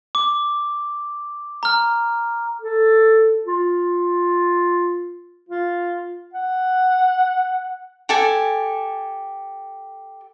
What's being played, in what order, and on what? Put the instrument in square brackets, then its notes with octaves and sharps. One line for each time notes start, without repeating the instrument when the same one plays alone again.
[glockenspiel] D6
A#5 F6
[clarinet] A4
F4
[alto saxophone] F4
F#5
[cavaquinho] G4 A4 G#5